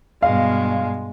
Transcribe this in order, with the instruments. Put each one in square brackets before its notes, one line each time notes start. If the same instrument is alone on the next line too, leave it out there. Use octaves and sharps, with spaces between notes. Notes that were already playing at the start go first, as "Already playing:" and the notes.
[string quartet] G2 B2 G#3 [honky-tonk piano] F5